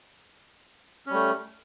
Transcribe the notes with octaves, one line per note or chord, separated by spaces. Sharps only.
G3 A3 C#4